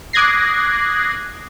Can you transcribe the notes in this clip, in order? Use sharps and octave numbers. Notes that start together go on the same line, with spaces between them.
D6 D#6 F#6 G#6 A#6 C7